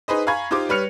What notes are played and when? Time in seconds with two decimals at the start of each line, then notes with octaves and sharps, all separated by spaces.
0.08 D#4 G#4 B4 C5 D#5
0.27 F5 G#5 A#5 B5 C#6 G#6
0.51 D#4 F4 G4 C5 D6
0.69 G3 B4 C#5 F6 C#7 F7